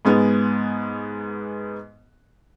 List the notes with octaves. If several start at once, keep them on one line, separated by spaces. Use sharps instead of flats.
G#2 G#3 B3